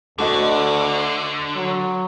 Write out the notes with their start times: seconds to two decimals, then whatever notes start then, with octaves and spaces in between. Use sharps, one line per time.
0.19 D2 D3 A3 F#4 D#5
1.56 F#3